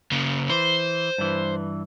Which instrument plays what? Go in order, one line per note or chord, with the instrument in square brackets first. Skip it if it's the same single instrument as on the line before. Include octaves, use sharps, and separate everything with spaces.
[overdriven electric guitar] C#3 A#3
[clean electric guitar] E3 [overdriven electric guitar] C5
[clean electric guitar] G2 E3